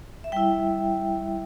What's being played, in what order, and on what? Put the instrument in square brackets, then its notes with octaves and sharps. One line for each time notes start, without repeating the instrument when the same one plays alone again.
[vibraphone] E5
G3 E4 G5